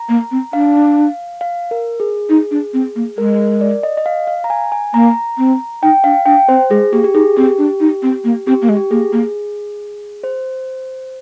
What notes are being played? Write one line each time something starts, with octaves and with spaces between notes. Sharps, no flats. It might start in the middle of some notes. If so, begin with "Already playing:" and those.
Already playing: A#5
A#3
C4
D4 F5
F5
A#4
G#4
D#4
D4
C4
A#3
G#3 A#4
A#4
D5
D#5
D#5
F5
F5
A#5
G#5
G#5
A#3 A#5
C4
D#4 G5
D4 F5
D4 G5
C4 C5
G#3 G#4
A#3 G4
G4
D#4 G#4
C4 G4
D4
D#4
C4
A#3
C4 G4
A#3
G#3
G4
A#3 G#4
A#3
C5